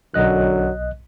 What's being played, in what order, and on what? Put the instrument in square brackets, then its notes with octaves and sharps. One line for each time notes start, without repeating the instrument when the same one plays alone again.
[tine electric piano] B1 D#5 F#6 [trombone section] F#2 D3 F#3